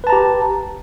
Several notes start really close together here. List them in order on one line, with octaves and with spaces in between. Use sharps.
B4 A5 A#5 G4